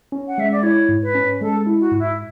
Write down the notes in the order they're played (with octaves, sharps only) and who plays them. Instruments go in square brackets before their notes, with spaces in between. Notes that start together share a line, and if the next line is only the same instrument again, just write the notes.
[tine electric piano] C#4
[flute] F#5
[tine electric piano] G#3 [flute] E5
[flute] D5
[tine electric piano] E4 [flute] C#5
[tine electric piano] G#2
[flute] B4
[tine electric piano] C#4
[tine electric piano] G#3 [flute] A4
[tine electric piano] E4
[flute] F#4
[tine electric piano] G#2
[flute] E4